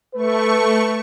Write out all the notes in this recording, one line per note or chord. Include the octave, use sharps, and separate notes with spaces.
A3 B4 C#6